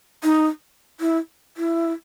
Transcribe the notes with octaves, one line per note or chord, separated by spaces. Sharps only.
D#4
E4
E4